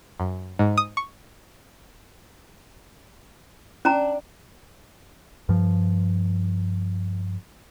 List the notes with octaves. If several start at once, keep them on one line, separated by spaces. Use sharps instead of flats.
F#2
G#2
D#6
C#6
C#4 D4 A#5
G2 F3